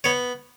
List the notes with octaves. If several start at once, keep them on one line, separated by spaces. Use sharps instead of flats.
B3 C#5